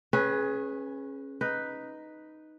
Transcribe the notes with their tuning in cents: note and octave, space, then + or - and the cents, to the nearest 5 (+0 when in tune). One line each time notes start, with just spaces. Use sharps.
C#4 -20 G#4 +20 B4 -5
D#4 +0 B4 +0